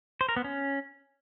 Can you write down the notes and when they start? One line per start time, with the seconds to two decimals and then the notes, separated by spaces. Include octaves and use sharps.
0.21 C5
0.29 A#4
0.36 B3
0.44 C#4